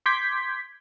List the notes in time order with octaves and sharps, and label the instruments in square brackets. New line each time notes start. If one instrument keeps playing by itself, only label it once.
[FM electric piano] C6 D6 G6 G#6 B6